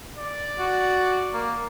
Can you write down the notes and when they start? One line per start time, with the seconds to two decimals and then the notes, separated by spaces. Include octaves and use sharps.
0.18 D5
0.59 F#4
1.34 A#3